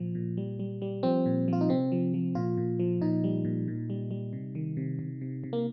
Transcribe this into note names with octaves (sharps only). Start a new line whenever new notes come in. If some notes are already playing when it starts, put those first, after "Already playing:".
Already playing: A#2 F3
A#2
G3
G3
G3
F3 C4
A#2
F3 F4
D#4
C3 C4
F3
F3
A#2 F4
A#2
F3
A#2 D#4
G3
A#2
A#2
G3
G3
C3
D#3
C3
C3
C3
C3
A#3